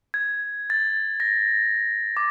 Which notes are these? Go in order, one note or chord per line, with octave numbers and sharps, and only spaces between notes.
G#6
A6
A#6
D6